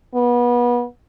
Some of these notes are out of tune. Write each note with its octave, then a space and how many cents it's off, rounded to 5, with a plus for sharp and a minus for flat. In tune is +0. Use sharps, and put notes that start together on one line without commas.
B3 -30